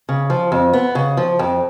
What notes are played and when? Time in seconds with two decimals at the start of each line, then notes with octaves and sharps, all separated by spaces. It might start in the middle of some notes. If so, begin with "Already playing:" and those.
0.09 C#3
0.30 F3
0.52 F2
0.73 B3
0.95 C#3
1.17 F3
1.39 F2